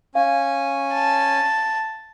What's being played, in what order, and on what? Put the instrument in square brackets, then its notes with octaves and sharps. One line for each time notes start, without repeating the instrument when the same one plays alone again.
[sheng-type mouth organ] C#4 G#5 [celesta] F5
[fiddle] A5